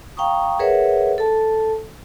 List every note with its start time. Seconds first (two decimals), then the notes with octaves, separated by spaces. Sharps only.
0.17 F5 G5 A#5 C#6 D#6
0.59 G#4 A#4 B4 C#5 E5 F#5
1.18 A4 A5